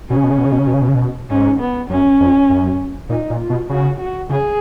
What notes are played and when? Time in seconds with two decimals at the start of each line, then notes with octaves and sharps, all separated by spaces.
0.09 B2 C#4
0.17 C#3
0.24 B2
0.31 C#3
0.38 B2
0.45 C#3
0.52 B2
0.59 C#3
0.67 B2
0.74 C#3
0.82 B2
0.88 C#3
0.95 B2
1.30 G#2 C#4
1.60 B3
1.90 F#2 C#4
2.20 F2
2.50 F#2
3.09 A#2 D#4
3.30 A#2
3.40 F4
3.50 B2
3.69 C#3 F#4
3.99 F#4
4.30 C#3 G#4